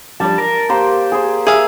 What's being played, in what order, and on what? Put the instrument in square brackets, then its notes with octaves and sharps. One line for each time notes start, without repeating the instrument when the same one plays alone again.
[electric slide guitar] F3 G3 D4 [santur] D5 A5
[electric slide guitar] A#4
[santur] A#3 C5 C6 [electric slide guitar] G4
[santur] G#4 C5
[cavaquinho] G#4 F5 [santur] E5